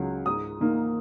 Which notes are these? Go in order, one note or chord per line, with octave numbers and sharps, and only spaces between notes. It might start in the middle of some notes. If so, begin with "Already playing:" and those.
Already playing: C#2 C#3 F#3
G#2 D#6
D#3 A#3 D#4